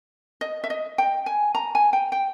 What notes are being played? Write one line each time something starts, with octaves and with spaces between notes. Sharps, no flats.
D#5
E5
D#5
G5
G#5
A#5
G#5
G5
G5